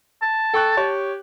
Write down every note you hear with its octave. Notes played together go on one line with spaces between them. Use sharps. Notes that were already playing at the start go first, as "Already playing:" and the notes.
A5
A4 G5 C#6 F#6
G4 C#5